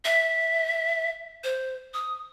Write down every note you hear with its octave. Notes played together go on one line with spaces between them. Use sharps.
E5
C5
D#6